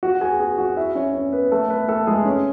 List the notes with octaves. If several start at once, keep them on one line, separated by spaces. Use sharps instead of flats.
F#4 F#5
G#4 G#5
G#4 G#5
F#4 F#5
E4 E5
C#4 C#5
C#4 C#5
B3 B4
A3 A4
B3 B4
A3 A4
G#3 G#4
C#4